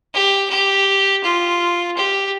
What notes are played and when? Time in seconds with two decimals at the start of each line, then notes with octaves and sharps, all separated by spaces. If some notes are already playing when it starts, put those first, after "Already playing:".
0.14 G4
0.50 G4
1.24 F4
1.97 G4